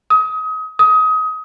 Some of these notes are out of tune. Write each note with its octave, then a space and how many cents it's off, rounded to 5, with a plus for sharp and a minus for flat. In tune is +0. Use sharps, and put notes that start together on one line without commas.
D#6 +30
D#6 +25